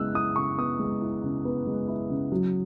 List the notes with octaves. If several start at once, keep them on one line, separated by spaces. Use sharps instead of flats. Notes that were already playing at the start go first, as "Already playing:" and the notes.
Already playing: C#3 G#3 B3 E4 E6 F#6
E4 D#6
C#3 C#6
B3 D#6
G#3
E4
C#3
B3
G#3
E4
C#3
F#3